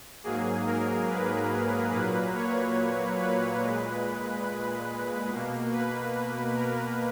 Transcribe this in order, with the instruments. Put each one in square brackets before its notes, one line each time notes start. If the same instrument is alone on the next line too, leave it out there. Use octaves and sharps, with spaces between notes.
[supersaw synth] G#2 F#3 A#3 G#4
A#4
B4
A#2 F#3 A#3 B4
C#5
B4
A#2 G#3
B2 A#3
B4
A#4